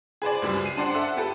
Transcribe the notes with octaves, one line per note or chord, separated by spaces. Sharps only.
G#4 B4 C5 D5
C#2 F#2 G3
C7 D#7
D4 C5 D5 F#5 C6
A4 E5 F#5
B3 G4 A4 B4